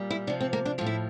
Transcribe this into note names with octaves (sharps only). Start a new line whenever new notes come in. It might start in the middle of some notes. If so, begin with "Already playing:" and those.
Already playing: A#2 G3
E4
C3 F3 D4
C4
A#3
D4
A2 F3 F4
E4